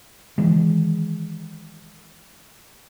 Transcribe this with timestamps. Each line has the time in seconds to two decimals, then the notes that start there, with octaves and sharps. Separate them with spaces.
0.38 D#3 E3 G#3